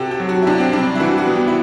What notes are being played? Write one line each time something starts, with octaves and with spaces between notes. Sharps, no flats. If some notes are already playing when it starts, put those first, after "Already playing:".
Already playing: C3 F#4 G4 A4
G4
F#3
F#4
E4
C3 D4
C4
G3 D4
E4
E3 F#4
F#4
B3
G4
E4